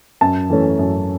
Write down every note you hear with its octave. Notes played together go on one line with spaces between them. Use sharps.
F#2 A5
E3 A3 C#4
F#2